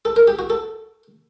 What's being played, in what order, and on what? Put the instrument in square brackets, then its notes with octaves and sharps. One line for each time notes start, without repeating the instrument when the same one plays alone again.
[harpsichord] A4
A#4
G4
F#4
A4